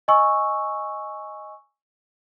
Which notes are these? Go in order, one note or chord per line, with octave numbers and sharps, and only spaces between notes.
D#5 G#5 C#6 E6